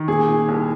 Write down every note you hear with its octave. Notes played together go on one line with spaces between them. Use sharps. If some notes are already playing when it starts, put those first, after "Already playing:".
Already playing: D#3
A#2 G#4
A#2
C2